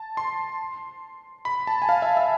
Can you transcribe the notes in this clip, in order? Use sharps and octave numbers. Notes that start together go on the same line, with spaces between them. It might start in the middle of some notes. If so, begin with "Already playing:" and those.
Already playing: A5
C6
B5
A5
G#5
F5
E5
E5